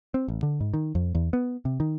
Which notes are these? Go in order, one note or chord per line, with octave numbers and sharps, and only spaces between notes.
C4
A1
D3
G#2
D#3
F2
E2
B3
C3
D#3